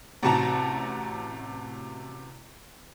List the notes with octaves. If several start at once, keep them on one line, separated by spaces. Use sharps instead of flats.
A1 C3 F#4 A5 A#5